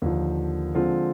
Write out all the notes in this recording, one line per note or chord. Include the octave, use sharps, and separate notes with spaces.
D#2 D3 F3
D3 F3 G#3 C4 F4